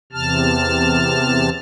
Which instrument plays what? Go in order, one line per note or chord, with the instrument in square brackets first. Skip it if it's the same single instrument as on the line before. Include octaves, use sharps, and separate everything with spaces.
[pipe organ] E2 C3 A5 F6